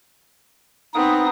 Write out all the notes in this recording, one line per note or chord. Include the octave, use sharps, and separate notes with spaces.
B3 C4 D#4 D#6